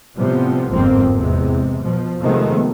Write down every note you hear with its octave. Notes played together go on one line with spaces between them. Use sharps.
A2 C3 F3 G3 B3
G1 F2 G#2 F3 A#3 C4
E2 C3 G#3
B2 F3
C3 D#3 F3 G#3 A3 B3